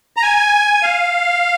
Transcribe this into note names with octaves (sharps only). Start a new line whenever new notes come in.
A#5
G#5
F5